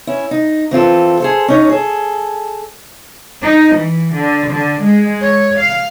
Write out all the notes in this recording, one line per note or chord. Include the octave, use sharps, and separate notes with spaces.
C#4 E4
D#4
E3 C4 F4 A4
G#4 A4 C5
C#4 D#4 C#5
G#4 A4
D#4
E3
D3
D3
G#3
C#5
F5